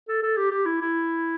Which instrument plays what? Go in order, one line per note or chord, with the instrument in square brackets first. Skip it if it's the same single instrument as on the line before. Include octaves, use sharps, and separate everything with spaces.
[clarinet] A4
A4
G4
G4
E4
E4